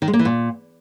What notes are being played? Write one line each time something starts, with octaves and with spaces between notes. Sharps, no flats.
D#3
G#3
A#3
E3
A#2